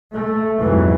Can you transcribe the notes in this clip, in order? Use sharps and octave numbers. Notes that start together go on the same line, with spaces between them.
A3
F2 G#2 B2 E3 F#3